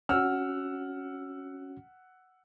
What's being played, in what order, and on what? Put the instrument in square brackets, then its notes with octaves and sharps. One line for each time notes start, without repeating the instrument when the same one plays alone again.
[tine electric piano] C#4 F#4 [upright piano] F#5 E6 F6